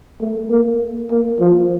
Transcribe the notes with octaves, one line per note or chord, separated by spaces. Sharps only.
A3
A#3
A#3
F3